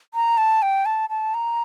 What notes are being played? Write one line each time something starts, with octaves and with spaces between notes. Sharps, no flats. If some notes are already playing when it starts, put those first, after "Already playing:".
A#5
A5
G5
A5
A5
A#5